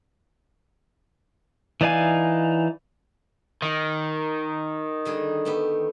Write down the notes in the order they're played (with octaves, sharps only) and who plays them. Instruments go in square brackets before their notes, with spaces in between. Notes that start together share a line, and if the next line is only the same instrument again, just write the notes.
[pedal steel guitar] E3 D#4 D5 F5 G#5
[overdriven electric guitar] D#3
[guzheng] D3 G3 G#4
A3 B3 G4